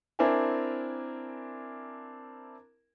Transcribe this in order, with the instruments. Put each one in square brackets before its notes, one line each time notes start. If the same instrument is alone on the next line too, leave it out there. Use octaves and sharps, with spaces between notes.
[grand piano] C4 D4 E4 A#4 E5 G#5